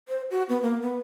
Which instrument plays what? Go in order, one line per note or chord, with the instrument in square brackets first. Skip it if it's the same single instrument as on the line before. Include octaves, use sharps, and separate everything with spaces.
[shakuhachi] C5
F#4
B3
A#3
B3